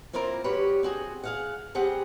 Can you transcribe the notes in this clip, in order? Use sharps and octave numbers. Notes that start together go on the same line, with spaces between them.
A#3 C4 E4 F4 A#4 C5
G3 F#4 G4 B4 C#5
C4 F#4 G#4
G#4 F5 F#5
G3 C4 G4 G#4 F#5